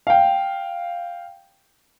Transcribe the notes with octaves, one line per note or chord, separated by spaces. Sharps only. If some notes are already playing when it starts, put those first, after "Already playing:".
F5 G5